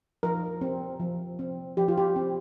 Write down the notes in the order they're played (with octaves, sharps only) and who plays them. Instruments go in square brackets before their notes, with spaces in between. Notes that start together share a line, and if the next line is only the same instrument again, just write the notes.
[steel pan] F3 A#4
C4
F3
C4
F3 G4
F4
G4
C4